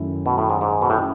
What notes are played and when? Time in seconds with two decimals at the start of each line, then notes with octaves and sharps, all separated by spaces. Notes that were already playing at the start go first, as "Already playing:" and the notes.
Already playing: F#2 D#3 A3 E4
0.26 B2
0.38 A2
0.50 G#2
0.61 G#2
0.82 B2
0.90 A2
0.98 C#4 E4